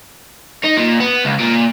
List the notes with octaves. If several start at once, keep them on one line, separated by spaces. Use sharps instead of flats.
D#4
A#2
B3
C#2
A#2